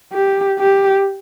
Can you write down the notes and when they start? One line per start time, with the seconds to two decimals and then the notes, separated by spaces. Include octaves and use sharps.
0.13 G4
0.59 G4